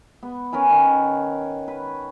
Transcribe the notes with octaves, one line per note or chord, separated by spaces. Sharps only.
B3
C#4 A#4 B4 G#5
D#3
B4